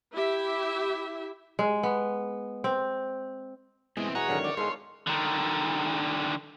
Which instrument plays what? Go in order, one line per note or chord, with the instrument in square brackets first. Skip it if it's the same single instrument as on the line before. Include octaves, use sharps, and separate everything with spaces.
[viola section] E4 G4 E5
[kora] G#3
B3
C4
[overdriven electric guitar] B2 C4 [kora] E3 [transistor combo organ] G#3
[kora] B2 G#3 [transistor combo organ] G#4 F#5 A#5 [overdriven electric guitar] C#5
[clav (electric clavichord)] G#1 D3 F#3 [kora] A#4 D5
[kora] D#4 C5 [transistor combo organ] D5
[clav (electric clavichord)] G#2 G#3 [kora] B3 A4 F5 [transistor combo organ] C6
[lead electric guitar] D3 D#3